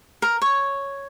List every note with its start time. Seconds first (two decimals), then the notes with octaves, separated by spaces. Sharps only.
0.22 A#4
0.42 C#5